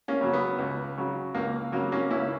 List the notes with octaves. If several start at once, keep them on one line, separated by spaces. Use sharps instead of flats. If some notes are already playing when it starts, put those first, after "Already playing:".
A#3 C#4
C#3 F#3
B3
C#2
C#3 F#3
C#2 A#3
C#3 F#3 A#3
A#3 C#4
C#2 C#4 E4